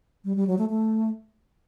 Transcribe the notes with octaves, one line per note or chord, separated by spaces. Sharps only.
G3
G3
F#3
A3
A3